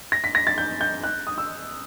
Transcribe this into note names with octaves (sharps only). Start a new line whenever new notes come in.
A#6
B6
A#6
A6
G6
G6
F#6
D#6
E6